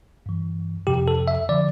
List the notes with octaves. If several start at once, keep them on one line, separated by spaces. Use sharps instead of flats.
G2 E3
F2 C3 F3 G4
A4
E5
D3 F3 D5